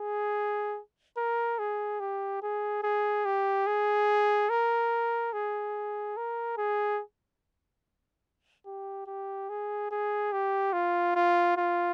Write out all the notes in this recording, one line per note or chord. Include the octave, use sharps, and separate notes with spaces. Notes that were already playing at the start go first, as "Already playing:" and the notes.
Already playing: G#4
A#4
G#4
G4
G#4
G#4
G4
G#4
A#4
G#4
A#4
G#4
G4
G4
G#4
G#4
G4
F4
F4
F4